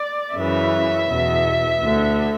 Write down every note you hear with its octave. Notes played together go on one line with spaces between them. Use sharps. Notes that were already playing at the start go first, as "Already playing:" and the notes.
Already playing: D5
F#2 C#3 E3 E5
E2 B2
D2 D3